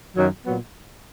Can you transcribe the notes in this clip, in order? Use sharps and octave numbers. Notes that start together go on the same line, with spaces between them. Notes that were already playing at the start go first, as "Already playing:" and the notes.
F#2 D#3 F#3
A#2 F#3 B3